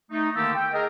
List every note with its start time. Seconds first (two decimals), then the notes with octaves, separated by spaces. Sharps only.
0.11 A3 D#4
0.35 D3 D#3 A#3 G4 A5 E6
0.55 G5
0.73 G#4 A#4 D#5